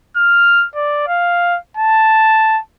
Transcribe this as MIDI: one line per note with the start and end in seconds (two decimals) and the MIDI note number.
0.17 0.66 89
0.75 1.05 74
1.08 1.58 77
1.77 2.60 81